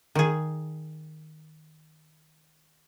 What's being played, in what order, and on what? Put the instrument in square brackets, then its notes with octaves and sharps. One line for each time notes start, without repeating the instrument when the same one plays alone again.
[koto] D#3 G#4